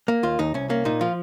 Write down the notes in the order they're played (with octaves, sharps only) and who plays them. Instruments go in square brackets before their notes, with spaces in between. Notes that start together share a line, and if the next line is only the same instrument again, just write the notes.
[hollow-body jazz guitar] A#3
D#2 F4
D#2 D#4
C2 C#4
A#3 C#4
A#2 D#4
F3 F4